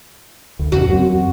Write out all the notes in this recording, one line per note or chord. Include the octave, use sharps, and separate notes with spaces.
D2
E2 C#3 F#4
F#2 C4